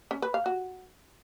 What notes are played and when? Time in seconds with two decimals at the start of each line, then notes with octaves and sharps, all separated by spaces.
0.11 C#4
0.22 B4
0.34 F5
0.46 F#4